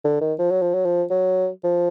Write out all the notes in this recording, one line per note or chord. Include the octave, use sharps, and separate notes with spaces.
D3
D#3
F3
F#3
F3
F#3
F3
F#3
F3